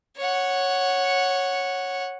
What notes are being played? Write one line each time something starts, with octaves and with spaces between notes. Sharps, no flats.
C#5 F#5